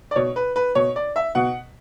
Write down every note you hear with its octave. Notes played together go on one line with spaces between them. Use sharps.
D5
B2 C#5
B4
B4
B2 C#5
D5
E5
B2 F#5